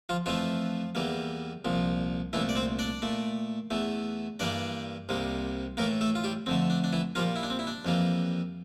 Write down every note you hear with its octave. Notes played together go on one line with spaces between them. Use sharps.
F3 F4
F2 E3 F3 A3 F4
E2 E3 G3 A#3
C2 A#2 F3
C2 A#2 E3 A3 E4
D5
C4 C5
D4 D5
A#2 A3
E2 E3 A3
G2 E3 G3 A#3 D4 D5
C2 C3 G3 A#3
A2 E3 A3 A#3 A#4
A3 A4
F4
G3 G4
F2 D3 A3 C4
D4
D4
E3 E4
A#2 F3 G3 A#3 F4
E4
D4
C4
E4
D4
F2 E3 G3 A#3